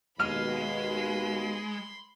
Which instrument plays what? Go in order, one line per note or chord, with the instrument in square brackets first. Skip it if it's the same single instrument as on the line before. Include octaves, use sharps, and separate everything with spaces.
[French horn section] D#2 B2 [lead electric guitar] G#3 [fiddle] B5 C6 [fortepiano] F6